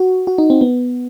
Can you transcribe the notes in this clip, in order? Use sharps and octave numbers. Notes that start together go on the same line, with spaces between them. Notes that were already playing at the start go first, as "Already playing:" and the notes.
Already playing: F#4
F#4
D#4
C4
B3